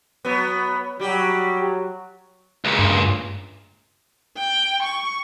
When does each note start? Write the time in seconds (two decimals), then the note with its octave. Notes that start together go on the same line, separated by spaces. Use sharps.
0.25 F#3 B3
0.99 F#3 G3 G4
2.65 C#2 A#2
2.79 G2
4.37 G5
4.83 C#6